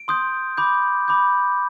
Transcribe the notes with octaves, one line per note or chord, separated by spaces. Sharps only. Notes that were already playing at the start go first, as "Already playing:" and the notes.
Already playing: D7
C6 D#6 G6
B5 D6 G6
B5 D6 G6